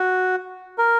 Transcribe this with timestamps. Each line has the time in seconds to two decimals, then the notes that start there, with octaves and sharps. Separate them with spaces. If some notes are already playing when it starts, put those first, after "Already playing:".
Already playing: F#4
0.78 A#4